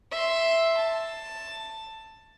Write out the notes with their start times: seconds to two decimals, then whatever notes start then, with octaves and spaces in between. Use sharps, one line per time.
0.11 E5 C6
0.77 A5